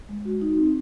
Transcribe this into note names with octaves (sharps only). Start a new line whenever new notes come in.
G#3
F#4
D#4
C4